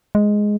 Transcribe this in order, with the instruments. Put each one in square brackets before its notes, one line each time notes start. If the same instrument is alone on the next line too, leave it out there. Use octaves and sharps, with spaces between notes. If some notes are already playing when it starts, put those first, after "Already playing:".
[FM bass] G#3